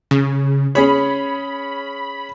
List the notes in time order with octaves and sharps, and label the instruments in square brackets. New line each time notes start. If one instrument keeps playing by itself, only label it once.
[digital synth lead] C#3
[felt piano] C#4 G#4 C#5 [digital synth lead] B5